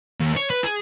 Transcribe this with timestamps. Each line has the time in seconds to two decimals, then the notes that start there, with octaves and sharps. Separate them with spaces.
0.20 D#2
0.36 C#5
0.50 B4
0.63 G#4